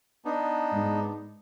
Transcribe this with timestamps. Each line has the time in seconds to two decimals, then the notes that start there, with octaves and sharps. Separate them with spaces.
0.25 B3 D4 D#4
0.73 G#2